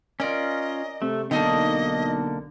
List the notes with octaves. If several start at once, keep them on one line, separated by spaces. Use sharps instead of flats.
C#4 F4 A#4 D5 D#5
C3 A3
B1 D3 A#3 D4 D#4 G4 D#5